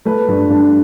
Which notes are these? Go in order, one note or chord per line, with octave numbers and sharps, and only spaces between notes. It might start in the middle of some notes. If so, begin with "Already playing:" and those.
A3 B4
G2
D4